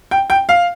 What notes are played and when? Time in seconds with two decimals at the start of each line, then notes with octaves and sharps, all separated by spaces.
0.11 G5
0.30 G5
0.49 F5